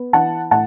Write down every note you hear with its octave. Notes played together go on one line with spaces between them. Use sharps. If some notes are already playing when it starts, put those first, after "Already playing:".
Already playing: B3
E3 F#5 A5
A2 F#5 A5